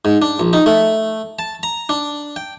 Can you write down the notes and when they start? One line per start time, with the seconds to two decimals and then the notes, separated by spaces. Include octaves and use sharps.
0.05 G#2
0.22 D4
0.40 A#1
0.53 D#4
0.66 A3
1.39 A5
1.63 A#5
1.89 D4
2.36 G5